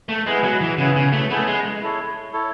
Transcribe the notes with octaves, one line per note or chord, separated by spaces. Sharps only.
A3
G#3 B3 E4 G#4 B4
F#3
E3
C#3 B3 E4 G#4 B4
C#3
A3
A3 B3 E4 G#4 B4
G#3
E4 A4 C#5
E4 A4 C#5